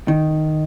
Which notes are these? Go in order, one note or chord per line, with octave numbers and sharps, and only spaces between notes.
D#3